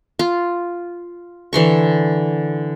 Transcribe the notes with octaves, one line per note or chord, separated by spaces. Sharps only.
F4
D3 E3 C6 C#6